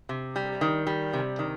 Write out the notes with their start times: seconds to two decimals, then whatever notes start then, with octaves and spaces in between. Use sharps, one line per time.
0.09 C3
0.36 G3
0.61 D#3
0.87 G3
1.13 C3
1.39 D#3